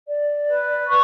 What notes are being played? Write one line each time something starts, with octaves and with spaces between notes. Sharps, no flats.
D5
B4
C#6